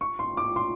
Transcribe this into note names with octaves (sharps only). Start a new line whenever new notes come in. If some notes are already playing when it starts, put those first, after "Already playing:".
C#6
C6
D6
C6